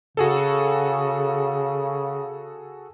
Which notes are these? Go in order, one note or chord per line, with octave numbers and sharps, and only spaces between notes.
C#3 F#4 G#4 A4